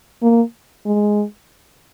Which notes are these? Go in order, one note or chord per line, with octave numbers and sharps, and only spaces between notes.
A#3
G#3